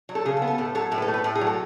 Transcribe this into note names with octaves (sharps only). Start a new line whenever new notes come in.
F#3
A4
C#3 G#4
A4
B3
A4
A2 A4
F#3 A4
A2 A4
B4
A4
A3
B4
A2 A4
G#4
F#3
A4